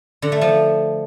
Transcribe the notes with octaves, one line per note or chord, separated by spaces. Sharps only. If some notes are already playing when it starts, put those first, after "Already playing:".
D3
A3
F3